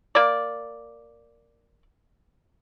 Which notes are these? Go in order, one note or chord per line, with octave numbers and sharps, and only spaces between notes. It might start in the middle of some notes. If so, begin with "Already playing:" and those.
A#3 D5